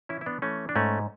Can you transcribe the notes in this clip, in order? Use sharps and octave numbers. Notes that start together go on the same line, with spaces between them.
E3 C#4 E4
E4
B3 D4
E3 A3 C#4
D4
G#2 A3 C#4